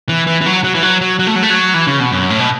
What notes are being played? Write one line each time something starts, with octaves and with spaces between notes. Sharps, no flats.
E3
E3
E3
F#3
F#3
E3
F#3
F#3
F#3
A3
F#3
A3
F#3
E3
C#3
B2
F#2
A2
B2